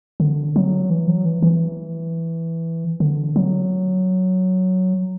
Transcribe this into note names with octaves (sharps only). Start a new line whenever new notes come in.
D3
F#3
E3
F#3
E3
E3
D3
F#3